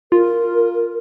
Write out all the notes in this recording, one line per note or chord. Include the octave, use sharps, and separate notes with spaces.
F4 A#4